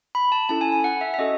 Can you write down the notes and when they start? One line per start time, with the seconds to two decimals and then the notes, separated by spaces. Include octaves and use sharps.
0.15 B5
0.32 A5
0.49 C#4 E4 A4 A5
0.61 G#5
0.72 G#5
0.84 F#5
1.01 E5
1.14 E5
1.19 C#4 F#4 A4 D#5